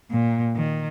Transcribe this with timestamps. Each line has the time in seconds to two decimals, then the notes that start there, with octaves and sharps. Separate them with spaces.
0.11 A#2
0.55 D#3